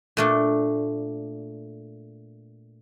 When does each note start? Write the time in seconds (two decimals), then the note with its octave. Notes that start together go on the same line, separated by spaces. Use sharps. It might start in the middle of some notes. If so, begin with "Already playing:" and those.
0.17 A#2 A3 D4